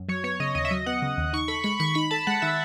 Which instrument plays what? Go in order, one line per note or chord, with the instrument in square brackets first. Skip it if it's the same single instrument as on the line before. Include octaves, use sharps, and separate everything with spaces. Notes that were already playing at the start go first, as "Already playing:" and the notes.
Already playing: [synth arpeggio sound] F#2
[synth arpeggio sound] F#3 [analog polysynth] C#5
[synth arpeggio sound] B3 [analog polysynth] C#5
[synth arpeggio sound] C#3 [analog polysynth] D#5
[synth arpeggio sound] D#2 [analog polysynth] D#5
[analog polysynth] E5
[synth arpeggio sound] F#3 [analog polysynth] D#5
[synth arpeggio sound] B3 [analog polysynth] F#5
[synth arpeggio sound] C#3
D#2
[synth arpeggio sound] D#4 [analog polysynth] C#6
[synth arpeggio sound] A4 [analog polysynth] B5
[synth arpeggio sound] G#3 [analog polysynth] B5
[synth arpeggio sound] D#3 [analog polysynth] C#6
[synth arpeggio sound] D#4 [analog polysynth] B5
[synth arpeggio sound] A4 [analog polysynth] A5
[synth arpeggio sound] G#3 [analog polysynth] F#5
[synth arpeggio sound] D#3 [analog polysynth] E5